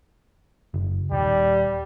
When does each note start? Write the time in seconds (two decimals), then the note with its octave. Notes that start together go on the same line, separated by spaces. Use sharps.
0.74 F#1
1.12 D#1 G3